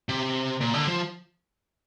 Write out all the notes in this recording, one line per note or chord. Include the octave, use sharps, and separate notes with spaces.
C3
A#2
D3
F3